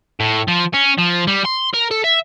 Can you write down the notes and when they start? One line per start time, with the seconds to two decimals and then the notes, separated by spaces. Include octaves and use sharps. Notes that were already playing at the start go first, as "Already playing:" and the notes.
0.20 A2
0.48 F3
0.74 C#4
0.98 F3
1.27 G3
1.45 C6
1.74 A#4
1.91 A4
2.04 E5